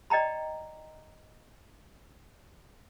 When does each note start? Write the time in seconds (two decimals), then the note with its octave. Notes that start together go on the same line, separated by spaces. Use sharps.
0.10 D5 D#5 G5 A#5 B5